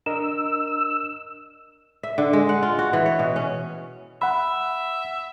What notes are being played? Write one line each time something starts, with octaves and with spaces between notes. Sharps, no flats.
D4 A#4 D#5 E6
E5
D3
G#3
F#5
F4
F#4
E3
C#5
B2
C#4
E5 F#5 B5